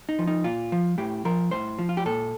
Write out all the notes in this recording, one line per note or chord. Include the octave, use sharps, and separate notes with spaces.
D#4
F3
D#4
A#2 F4
F3
A2 G4
F3 A#4
A2 C5
F3
F4
G4
A#2 A4